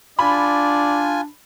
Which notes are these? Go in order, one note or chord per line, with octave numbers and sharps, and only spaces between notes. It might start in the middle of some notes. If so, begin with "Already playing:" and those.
D4 F4 D5 G#5 B5